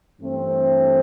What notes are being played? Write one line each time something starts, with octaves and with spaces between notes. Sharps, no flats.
G2 E3 A3 C4